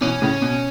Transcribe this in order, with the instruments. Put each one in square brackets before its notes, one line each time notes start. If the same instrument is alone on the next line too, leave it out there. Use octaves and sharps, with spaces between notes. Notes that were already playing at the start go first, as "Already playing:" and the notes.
[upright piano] B2 E3 [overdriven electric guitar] C#4
[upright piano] A2 C#3
B2